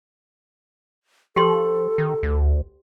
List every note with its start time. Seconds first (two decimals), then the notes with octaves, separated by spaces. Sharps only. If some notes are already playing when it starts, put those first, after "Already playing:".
1.36 F3 G4 A4 G5 C6
1.98 D#3
2.23 D2